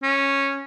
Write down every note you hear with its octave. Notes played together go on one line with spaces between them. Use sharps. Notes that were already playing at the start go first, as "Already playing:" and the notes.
C#4